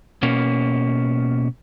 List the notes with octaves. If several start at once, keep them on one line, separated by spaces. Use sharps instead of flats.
B2 A#3 C#4